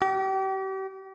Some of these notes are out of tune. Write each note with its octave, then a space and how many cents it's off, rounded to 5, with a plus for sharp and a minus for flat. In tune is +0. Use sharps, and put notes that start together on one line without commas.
G4 -35